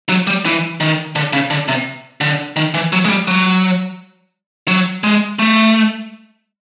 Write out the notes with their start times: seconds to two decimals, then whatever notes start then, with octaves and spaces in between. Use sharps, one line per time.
0.09 F#3
0.27 G3
0.45 E3
0.80 D#3
1.16 D3
1.33 C#3
1.50 D3
1.68 C3
2.21 D3
2.56 D#3
2.74 E3
2.92 F#3
3.05 G#3
3.09 G3
3.28 F#3
4.68 F#3
5.04 G#3
5.39 A3